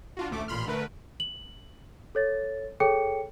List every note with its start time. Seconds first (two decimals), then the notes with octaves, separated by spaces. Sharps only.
0.17 D4 F4 F#4
0.30 A1 D2 A3 D6
0.48 A1 A#2 B5 C6 F6
0.67 D3 A3 A#4 B4
1.20 F#7
2.15 A4 C#5 A6
2.80 G#4 A4 C#5 G5 C#7